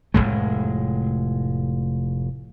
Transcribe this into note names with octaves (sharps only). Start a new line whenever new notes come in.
F1 D#2 A2 G#3